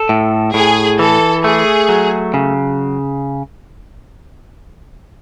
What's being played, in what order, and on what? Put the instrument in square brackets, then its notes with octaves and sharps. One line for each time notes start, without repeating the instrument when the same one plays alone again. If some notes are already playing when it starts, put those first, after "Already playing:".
Already playing: [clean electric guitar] A4
A2
[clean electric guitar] A2 [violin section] G#4
[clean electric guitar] E3 [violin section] A4
[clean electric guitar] A3 [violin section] G#4
[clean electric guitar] F#3
C#3